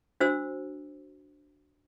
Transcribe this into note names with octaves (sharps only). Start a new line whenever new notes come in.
D4 F#4 C5 E6